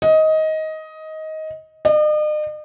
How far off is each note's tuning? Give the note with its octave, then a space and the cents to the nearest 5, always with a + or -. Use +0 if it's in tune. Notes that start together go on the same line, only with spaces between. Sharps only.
D#5 +15
D#5 -45